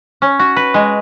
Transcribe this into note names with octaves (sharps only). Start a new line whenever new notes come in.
C#4
F#4
B4
G#3